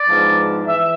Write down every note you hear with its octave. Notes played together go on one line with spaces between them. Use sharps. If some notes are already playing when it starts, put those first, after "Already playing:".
Already playing: D5
G#2 F3 B3 D4
E3 E5